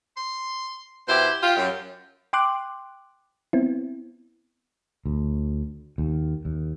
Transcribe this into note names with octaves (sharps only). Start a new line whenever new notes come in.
C6
B2 E4 G4 C5
F4 G4
F#2
G5 C6 D6 F#6
B3 C4 E4
D2
D#2
D#2